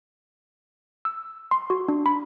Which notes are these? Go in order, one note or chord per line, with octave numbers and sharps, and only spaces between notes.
E6
C6
F#4
D4
B5